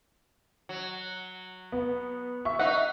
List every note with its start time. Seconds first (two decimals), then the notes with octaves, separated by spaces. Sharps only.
0.69 F#3
1.72 B3
2.45 E5 C#6
2.59 D#4 F#5